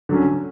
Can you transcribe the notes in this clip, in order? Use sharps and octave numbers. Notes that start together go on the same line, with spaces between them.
D3 F#3 C#4